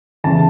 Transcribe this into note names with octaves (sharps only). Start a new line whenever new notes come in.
E2 C#3 E3 A5